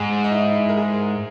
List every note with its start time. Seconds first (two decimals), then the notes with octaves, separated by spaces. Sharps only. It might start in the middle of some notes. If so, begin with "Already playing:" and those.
Already playing: G#2 G#3 G#4
0.24 D#4
0.32 E4
0.55 E4
0.69 A#4
0.77 G#3 G#4